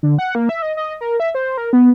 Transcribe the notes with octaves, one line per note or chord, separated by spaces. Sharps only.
D3
F#5
A#3
E5
D#5
D#5
A#4
E5
C5
A#4
B3